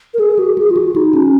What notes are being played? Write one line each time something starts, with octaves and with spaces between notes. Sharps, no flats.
A#4
G#4
F#4
G#4
F4
F#4
D#4
C#4